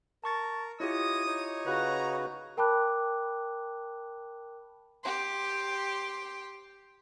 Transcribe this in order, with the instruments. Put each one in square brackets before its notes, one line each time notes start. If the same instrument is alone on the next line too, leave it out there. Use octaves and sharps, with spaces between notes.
[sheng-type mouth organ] A#4 [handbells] A5 C#6 A6
[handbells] E4 F4 G4 [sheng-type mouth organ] C#5 D#5 [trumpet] D#6
[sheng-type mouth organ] D#4 C#5
[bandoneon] C#3 F#4 B4 [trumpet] A#5
[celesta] A#4 G5 A5 B5 D6 F#6
[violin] G4 C6